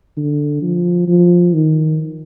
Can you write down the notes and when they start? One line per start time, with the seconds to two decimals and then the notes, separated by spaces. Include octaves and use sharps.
0.17 D3
0.62 F3
1.08 F3
1.54 D#3